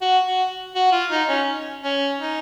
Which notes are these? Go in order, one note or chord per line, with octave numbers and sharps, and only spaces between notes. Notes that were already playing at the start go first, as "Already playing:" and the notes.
F#4
F#4
F#4
F4
D#4
C#4
C#4
D#4